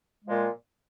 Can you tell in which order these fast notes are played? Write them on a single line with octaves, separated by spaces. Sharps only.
G#3 F3 A#2